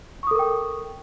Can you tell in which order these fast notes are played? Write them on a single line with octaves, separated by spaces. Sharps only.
C#6 D#6 A4 A#4 G5